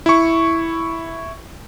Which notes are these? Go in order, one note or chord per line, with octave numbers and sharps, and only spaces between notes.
E4 C#6